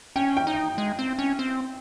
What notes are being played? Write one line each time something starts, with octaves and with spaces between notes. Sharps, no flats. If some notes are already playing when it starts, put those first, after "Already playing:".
C#4 G5
G5
D#4
G#3
C4
C#4
C4